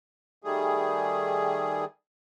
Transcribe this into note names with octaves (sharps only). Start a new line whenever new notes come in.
D#3 G3 A3 G#4